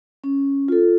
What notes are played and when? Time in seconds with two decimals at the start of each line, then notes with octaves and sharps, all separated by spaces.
0.24 C#4
0.68 F4 A4